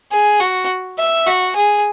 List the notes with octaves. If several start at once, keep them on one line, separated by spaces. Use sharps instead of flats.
G#4
F#4
E5
F#4
G#4